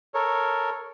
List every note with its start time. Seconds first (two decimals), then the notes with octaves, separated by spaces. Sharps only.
0.14 A4 A#4 C#5